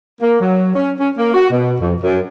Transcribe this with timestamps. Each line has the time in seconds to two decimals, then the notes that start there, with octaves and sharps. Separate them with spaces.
0.21 A#3
0.41 F#3
0.75 C#4
0.99 C#4
1.16 A#3
1.34 F#4
1.51 B2
1.81 F2
2.02 F#2